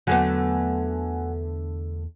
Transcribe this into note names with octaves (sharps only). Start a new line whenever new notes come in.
E2 D3 F#3 A3 B3 F#5 G#5